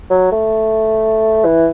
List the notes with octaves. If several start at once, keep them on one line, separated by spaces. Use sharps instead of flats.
F#3
A3
E3